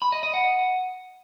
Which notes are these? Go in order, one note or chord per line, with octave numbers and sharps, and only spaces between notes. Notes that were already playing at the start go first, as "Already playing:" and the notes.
B5
D#5
D#5
F#5